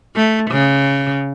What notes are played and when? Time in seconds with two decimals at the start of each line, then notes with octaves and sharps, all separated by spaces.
0.16 A3
0.50 C#3